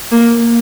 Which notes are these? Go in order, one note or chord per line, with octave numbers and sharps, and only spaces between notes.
A#3